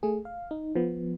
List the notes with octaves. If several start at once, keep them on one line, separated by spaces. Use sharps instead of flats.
A3 G#4
F5
D#4
F3 B3